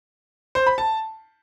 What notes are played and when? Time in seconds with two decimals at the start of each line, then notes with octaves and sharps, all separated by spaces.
0.55 C5
0.67 B5
0.78 A5